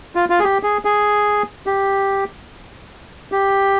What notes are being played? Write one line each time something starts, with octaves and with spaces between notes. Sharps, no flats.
F4
F4
G#4
G4
G#4
G#4
G4
G4